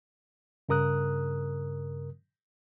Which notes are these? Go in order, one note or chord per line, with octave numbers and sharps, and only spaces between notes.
G2 C#3 A#4 D#6 F#6